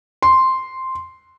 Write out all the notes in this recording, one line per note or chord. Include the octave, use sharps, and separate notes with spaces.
C6